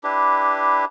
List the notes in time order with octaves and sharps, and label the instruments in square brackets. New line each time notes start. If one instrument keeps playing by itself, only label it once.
[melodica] D4 E4 G4 B4